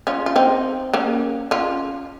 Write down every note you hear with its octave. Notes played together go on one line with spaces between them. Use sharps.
C#4 F4
F4
C4 D#4
A#3 C#4
C#4 F4